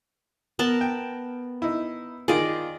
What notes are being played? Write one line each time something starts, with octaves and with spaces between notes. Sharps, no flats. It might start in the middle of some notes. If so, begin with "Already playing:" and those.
B3 A#4 A5
G5
D#4 E4
D#3 F4 G#4 D5 D#5